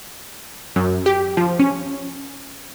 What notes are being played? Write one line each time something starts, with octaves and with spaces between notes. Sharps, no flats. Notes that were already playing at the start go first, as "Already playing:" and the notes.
F#2
G4
F3
C#4